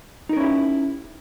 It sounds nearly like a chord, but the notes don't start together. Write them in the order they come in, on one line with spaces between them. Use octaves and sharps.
D#4 A#4 C#4 E4 G4